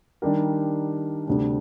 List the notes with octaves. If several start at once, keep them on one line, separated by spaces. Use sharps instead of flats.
D#3 G3 D4 G4 A#4
D2 C3 G3 D4